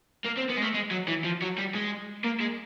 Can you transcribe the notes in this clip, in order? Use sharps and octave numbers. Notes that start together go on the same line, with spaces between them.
A#3
C4
B3
G#3
A3
G#3
F#3
E3
F3
F#3
G3
G#3
A#3
G#3